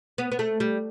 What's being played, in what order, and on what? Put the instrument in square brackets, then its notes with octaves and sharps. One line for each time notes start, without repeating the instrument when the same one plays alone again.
[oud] B3
B3
A3
G3